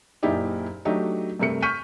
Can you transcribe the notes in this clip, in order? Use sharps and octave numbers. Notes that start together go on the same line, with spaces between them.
F#1 A#2 D#4 E4 G4 D5
F#3 A3 D4 D#4 G4
G2 C3 A3 A#4 C#7
C#6 F6 G6 B6 D#7